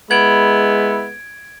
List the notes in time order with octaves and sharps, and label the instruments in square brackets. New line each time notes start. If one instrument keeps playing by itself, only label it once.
[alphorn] G#3 [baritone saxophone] B3 [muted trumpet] E4 [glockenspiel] G#6 D7